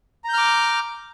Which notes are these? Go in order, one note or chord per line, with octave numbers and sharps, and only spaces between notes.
A#5 D6 F6 G6